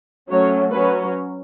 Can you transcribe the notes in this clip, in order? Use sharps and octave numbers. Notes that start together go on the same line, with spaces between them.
F#3 A3 C#4 C#5
F#3 C#4 B4